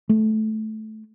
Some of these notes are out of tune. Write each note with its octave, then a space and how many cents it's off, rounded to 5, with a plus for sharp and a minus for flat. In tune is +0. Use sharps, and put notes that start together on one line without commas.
A3 -15